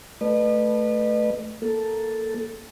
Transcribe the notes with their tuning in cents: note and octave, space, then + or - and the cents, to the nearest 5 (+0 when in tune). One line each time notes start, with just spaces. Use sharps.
A3 +0 B4 -10 D#5 -40
A#3 +0 A4 +0